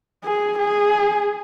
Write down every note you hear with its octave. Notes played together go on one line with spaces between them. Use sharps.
G#4
G#4